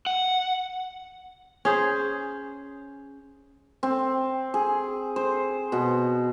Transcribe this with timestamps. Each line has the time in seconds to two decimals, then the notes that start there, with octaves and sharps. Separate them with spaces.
0.06 F#5
1.65 C#4 G#4 C5
3.83 C4
4.54 G#4
5.16 C5
5.72 B2